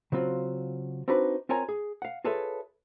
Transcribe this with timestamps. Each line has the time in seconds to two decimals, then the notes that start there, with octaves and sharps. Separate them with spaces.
0.12 C#3 F#3 C4 F4 F#4
1.08 C4 D4 D#4 F#4 B4
1.49 C4 F4 A#4 C#5 G#5 A#5
1.69 G#4
2.02 F5 F#5
2.24 F4 G#4 A4 B4 C#5 E5